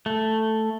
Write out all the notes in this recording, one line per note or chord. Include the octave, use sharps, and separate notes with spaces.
A3